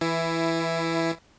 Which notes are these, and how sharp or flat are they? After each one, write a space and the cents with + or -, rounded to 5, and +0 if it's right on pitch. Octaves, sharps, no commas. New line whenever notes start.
E3 +0 E4 +10